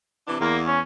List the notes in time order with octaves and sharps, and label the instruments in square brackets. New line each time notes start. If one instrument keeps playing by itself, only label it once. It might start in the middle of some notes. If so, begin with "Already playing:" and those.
[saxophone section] C3 E3 D4
[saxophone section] E2 [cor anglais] A#3
[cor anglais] C#4